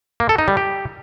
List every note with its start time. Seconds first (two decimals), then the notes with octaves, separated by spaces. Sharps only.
0.20 A#3
0.29 A4
0.38 D#4
0.48 G3
0.57 G4